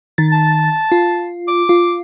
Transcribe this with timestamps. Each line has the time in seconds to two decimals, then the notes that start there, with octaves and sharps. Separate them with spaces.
0.18 D#3 A6
0.32 A5
0.92 F4
1.48 D6
1.69 F4